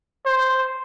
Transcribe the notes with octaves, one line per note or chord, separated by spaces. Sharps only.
C5